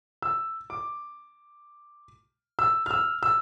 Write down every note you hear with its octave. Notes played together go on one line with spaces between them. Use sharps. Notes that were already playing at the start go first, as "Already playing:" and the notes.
E6
D6
E6
F6
E6
E6